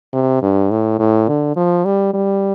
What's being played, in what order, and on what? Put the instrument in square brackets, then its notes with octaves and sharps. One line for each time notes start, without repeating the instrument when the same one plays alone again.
[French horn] C3
G2
A2
A2
D3
F3
G3
G3